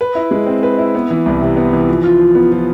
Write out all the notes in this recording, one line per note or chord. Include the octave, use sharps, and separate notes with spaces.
B4
E4
G#3
C4
B4
E4
B3
E3
C2
C3
B3
E3
F3
F4
F3
B3
F3